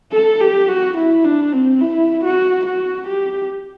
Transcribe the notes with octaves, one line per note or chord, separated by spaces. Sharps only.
A4
G4
F#4
E4
D4
C4
E4
F#4
F#4
G4